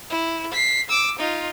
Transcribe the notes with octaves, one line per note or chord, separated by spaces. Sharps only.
E4
B6 C7
D6 E6
D#4 F4